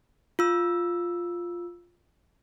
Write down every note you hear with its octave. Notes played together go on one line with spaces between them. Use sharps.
F4 E6